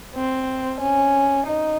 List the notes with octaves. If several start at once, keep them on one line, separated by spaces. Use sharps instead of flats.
C4
C#4
D#4